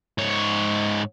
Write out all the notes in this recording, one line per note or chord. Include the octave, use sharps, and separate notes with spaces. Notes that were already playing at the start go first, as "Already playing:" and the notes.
G#2 C#5